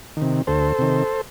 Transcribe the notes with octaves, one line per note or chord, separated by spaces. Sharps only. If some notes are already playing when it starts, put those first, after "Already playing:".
C3 D#3
D2 A4 C5
C3 D#3